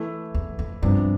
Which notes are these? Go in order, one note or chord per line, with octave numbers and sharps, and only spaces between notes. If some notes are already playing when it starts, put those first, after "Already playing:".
Already playing: E3 A3 E4
E2
F2
G2 C3 F3 B3 D4